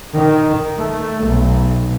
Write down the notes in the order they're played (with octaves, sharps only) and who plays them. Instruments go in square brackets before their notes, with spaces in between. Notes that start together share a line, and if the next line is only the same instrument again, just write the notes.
[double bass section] D#3
A3
B1